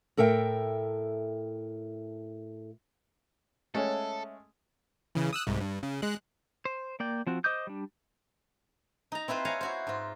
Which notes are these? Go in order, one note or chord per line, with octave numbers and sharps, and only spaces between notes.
A2 A4 A#4 E5 G5
G#3 A3 C#4 A4 C#5 E5 F#5
C#3 E3
D#6 E6 F#6
C2 G#2
G2
C#3
G#3 F#6
C5
A#3 D5 G5
F3 C4 F#4
C5 D#5 D6 D#6 G6
G3 D4
D#4 A#5
C4 E4 F4 B4 C5
C#5 F5 G#5 A#5
E4 F#4 C5
G#2 F4